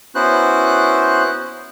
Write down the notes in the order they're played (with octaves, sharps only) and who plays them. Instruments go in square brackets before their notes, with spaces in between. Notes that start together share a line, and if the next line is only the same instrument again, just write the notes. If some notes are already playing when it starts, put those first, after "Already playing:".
[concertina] B3 C#4 E4 F#4 C5 F#6